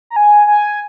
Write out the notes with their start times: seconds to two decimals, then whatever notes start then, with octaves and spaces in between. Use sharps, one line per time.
0.10 A#5
0.16 G#5
0.47 G#5